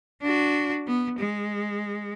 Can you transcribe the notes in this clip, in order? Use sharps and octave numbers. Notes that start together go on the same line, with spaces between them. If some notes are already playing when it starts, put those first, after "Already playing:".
D4 F#4
B3
G#3